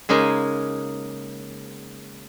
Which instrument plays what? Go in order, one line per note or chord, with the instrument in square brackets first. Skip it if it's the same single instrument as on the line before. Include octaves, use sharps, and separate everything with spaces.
[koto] C#3 G#3 A#3 D#4 G#5